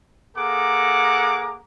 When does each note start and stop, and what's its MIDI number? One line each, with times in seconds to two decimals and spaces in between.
0.37 1.61 58
0.37 1.61 68
0.37 1.61 69
0.37 1.61 78
0.37 1.61 82
0.37 1.61 86